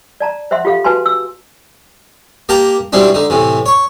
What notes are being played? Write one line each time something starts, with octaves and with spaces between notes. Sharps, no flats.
D5 A5 A#5
C5 E5 F#5 C6
F4 G4 A4 F5
F#4 B4 G#5 A5 C6
E6
A#3 G4 G5 A5 A#5
G#2 B2 G3 C4 D4 E4
D3 D#4
A2 C3 E3
C#5 C#6